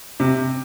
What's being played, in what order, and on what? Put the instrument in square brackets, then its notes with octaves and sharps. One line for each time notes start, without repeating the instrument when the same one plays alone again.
[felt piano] C3